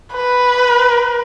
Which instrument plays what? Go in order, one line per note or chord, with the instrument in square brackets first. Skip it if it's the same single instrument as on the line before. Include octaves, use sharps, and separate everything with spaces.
[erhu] B4